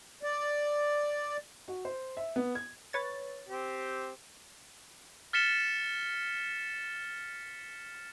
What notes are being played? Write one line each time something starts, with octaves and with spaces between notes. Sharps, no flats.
D5
F#4
C5
E5
B3
G#6
B4 C#5 A6
C4 G4
F6 A6 B6 C#7 E7 G7